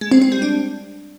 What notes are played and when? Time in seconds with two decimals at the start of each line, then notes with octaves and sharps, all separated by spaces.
0.01 G#3
0.11 C4
0.22 C4
0.32 G3
0.42 D4